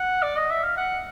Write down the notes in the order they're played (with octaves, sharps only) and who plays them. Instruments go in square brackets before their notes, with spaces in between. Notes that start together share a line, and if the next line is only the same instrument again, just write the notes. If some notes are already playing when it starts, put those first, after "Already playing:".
Already playing: [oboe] F#5
D5
D#5
E5
F5
F#5